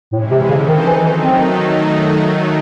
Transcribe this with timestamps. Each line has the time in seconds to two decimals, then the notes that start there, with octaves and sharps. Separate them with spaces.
0.12 A2 C3 E3 G#3 C#4 E4
0.31 C3
0.49 C#3 E3 C4 D#4 A4 C5
0.68 D#3
0.86 D#3 E3 F#3 A3 D#4
1.23 C4